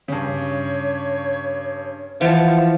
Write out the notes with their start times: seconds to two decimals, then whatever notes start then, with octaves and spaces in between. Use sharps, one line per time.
0.08 G2 C#3 C#5
2.21 E3 F3 F#5 A5